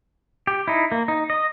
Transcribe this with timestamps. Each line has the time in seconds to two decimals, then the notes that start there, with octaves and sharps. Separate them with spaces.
0.47 G4
0.68 D#4 E4
0.92 A#3
1.08 D#4
1.30 D#5